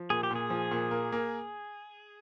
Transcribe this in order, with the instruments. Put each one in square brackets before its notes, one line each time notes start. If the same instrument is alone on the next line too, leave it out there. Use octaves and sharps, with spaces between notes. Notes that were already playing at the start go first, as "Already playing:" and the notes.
Already playing: [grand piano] F3
[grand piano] A#2 [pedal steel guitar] G#4
[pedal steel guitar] G4
[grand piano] A#2 [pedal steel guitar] G#4
[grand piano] F3
A#2
A#3
A#3